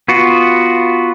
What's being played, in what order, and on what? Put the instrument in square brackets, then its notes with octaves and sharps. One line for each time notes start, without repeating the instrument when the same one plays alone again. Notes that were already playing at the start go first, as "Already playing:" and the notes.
[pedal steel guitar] B3 F4 F#4